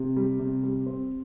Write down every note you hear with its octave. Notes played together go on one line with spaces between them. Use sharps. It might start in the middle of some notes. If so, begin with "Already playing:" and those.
Already playing: C3
G3
C3
G3
C4